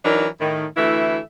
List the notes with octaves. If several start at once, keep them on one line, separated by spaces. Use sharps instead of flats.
E3 F#3 D4 D#4 A#4
A2 D#3
D2 E3 A3 E4 E5